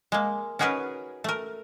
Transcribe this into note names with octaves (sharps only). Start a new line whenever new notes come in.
G#3 A#3
C#4 D#4 F#4 G#4 A#4 B4
A3 A#4